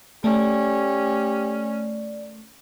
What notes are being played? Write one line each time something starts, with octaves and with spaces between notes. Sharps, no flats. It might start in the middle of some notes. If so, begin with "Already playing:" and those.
A3 C#4 G4 D5